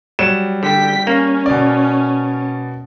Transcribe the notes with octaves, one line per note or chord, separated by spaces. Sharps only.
F#3 G3 E7
D3 G5 B6
A#3 C#4
B2 D5